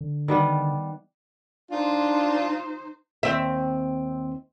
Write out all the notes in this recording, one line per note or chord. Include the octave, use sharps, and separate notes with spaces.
D3
D#3 G3 B3
D4 D#4 F4 C5
D#2 C4 E5